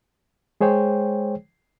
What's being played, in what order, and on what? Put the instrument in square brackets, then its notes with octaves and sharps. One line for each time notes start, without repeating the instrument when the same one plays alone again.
[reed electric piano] G#3 G#4 C5 C#5 G5